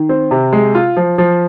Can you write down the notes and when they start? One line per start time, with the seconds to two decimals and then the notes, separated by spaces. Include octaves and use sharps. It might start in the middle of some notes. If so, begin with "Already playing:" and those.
Already playing: D#3
0.09 C4
0.31 C3
0.53 G#3
0.75 F4
0.97 F3
1.18 F3